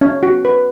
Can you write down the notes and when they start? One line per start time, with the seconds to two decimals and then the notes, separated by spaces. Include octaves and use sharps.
0.01 C#4
0.23 F#4
0.45 B4